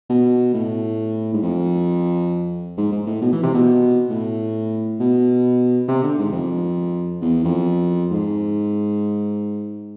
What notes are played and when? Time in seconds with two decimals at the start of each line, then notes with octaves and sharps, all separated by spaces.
0.10 B2
0.54 A2
1.34 G#2
1.43 F2
2.77 G#2
2.92 G#2
3.07 A2
3.22 B2
3.33 E3
3.43 C3
3.55 B2
4.10 A2
5.00 B2
5.88 C3
6.03 D3
6.18 G#2
6.33 F2
7.22 E2
7.45 F2
8.11 G#2